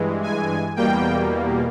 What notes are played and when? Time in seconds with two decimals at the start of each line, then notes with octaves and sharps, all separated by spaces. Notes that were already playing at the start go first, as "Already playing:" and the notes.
Already playing: G2 E3 G#3
0.23 G#5
0.76 E2 B2 G3 A#3 G5